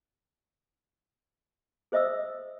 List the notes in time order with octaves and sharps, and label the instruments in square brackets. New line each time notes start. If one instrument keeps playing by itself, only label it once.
[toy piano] G#4 C5 D#5 E5 D#6 E6